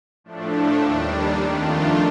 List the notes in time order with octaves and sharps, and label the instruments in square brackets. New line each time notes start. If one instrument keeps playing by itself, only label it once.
[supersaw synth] A2 F3 A3 D4
D#2 D#3 G3 D4
F2 D#3 A3 D4 F4